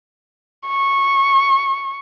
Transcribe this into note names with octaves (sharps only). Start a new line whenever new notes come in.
C#6